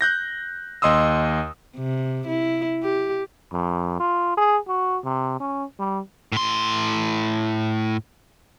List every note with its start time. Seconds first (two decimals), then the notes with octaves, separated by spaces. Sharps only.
0.01 F#6 G6 A#6
0.82 D#2 D#5 C6 D#6 E6
1.77 C3
2.27 E4
2.83 G4
3.53 F2
4.00 F4
4.37 G#4
4.68 F#4
5.04 C3
5.40 C#4
5.80 G3
6.32 A2 C6